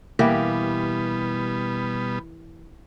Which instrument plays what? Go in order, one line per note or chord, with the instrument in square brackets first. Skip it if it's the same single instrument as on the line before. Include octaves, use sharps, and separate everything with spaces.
[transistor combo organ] B2 G3 B3 [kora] E3 A#3 G4